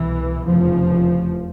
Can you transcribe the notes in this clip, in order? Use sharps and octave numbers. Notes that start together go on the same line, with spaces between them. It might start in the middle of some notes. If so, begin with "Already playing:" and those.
Already playing: C2 B2 E3
F1 E2 C#3 F3